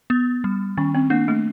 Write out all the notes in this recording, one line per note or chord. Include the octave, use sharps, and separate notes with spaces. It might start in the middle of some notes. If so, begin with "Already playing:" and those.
B3
G3
D#3 C#4
C4
A#3 D4
A3